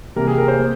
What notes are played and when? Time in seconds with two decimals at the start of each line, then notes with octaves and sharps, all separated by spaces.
0.16 C3 E3 G3 A#3 A#4
0.28 G#4
0.38 A#4
0.48 C5
0.59 A#3